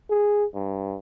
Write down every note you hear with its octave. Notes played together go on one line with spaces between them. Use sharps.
G#4
G2